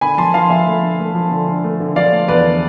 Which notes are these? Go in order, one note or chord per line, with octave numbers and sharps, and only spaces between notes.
D3 G#5 B5
F3 A5 C6
F3 F5 A5
F3 E5 G#5
A3
D3
A3
F3
D3
D3
A3
D3
F3 D5 F5
A3
E2 B4 D5
D3